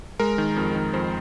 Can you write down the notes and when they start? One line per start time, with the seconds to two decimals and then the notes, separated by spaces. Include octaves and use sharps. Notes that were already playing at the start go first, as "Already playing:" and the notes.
0.20 G#3 A#4
0.38 D#3
0.56 F2
0.75 D#3
0.93 F2 C5